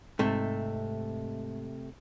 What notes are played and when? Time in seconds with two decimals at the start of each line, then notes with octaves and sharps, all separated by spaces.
0.19 G#2 C3 A3